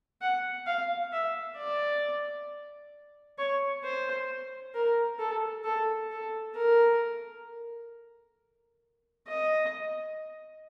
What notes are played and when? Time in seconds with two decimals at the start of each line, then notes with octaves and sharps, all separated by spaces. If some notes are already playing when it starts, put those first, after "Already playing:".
0.21 F#5
0.66 F5
1.12 E5
1.57 D5
3.38 C#5
3.84 C5
4.74 A#4
5.19 A4
5.64 A4
6.10 A4
6.55 A#4
9.27 D#5